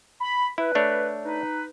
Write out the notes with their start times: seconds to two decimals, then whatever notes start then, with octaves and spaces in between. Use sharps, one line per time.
0.21 B5
0.58 E4 B4
0.75 A3 D4 C#5
1.24 D#4 B4